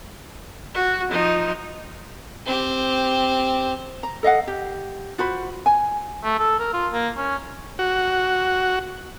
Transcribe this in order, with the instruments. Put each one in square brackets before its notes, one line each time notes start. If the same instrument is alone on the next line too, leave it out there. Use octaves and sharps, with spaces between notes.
[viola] F#4
F3 D#4
[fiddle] C4 G4
[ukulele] A#5
A4 D#5 F5 F#5
G4
F4 F#4 C5 B5
G#5
[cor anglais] A3
A4
A#4
F4
A#3
C#4
[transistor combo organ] F#4